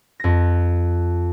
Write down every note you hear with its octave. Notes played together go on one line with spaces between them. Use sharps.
F2 A#6